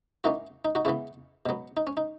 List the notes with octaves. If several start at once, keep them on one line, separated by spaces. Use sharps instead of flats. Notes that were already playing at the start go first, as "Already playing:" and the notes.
E3 A#3 C#4 D#4 F#4
D#4
D#4 F#4
C#3 E3 B3 C#4 E4
B2 F#3 B3
D#4
C#4
D#4